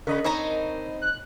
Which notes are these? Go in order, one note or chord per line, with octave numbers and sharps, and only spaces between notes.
C#3 A#4 D#5 B5
C4 D#4 C#5 A5 A#5
F#6